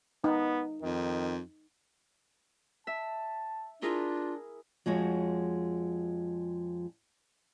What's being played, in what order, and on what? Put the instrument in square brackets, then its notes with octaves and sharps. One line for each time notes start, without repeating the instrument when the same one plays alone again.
[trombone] B3 [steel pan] D#4
[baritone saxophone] F2 [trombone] D#3
[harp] E5 [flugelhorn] A5
[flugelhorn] D4 [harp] E4 G#4 A#4 [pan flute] F4
[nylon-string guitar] F2 F3 G#3 F#4 C#5